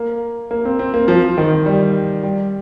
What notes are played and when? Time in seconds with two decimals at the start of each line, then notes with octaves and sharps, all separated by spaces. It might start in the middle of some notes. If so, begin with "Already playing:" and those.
Already playing: A#3
0.51 A#3
0.65 C4
0.79 C4
0.94 A#3
1.08 F3
1.23 F3
1.38 D#3
1.66 G3
2.23 G3